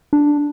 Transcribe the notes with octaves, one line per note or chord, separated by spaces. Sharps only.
D4